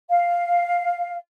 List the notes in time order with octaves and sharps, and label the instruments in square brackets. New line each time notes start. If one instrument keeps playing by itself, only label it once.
[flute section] F5